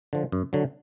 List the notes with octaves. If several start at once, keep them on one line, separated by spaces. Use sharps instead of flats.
D3 F3
F#2
D3 F#3